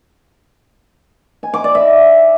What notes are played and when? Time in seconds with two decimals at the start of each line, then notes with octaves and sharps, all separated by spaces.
1.43 G#5
1.54 D6
1.64 D5
1.75 E5